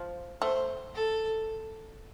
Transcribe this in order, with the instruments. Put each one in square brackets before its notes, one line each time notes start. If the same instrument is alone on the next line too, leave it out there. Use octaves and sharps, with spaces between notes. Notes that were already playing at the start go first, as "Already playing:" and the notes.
Already playing: [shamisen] F3
[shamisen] A3 [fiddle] C5
[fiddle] A4